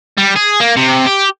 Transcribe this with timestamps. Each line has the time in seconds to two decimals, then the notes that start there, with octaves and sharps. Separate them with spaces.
0.17 G3
0.35 G#4
0.60 A#3
0.76 C3
1.06 G4